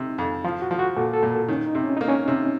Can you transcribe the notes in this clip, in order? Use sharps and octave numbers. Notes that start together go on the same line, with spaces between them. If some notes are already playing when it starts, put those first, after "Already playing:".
Already playing: C3 D#4
F2
F3 F4
F#4
F3
F#4
A#2 A4
A4
A#2
A#4
D#3 C#4
D#4
C3
C#4
A#3 D#4
C#4
C3